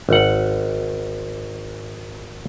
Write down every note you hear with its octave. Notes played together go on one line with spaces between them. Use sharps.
G#1 F#5